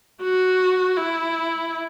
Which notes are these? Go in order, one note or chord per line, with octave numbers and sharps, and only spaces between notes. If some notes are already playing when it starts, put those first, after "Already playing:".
F#4
E4